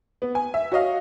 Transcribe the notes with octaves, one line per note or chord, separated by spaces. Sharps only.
B3
G#5
E5
F#4 C#5 D#5 F5